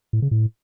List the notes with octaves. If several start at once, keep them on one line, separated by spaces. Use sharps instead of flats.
A2
C#3
A2